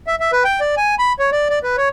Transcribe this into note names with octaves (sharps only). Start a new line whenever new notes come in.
E5
E5
B4
G5
D5
G#5
B5
C#5
D5
D5
B4
C#5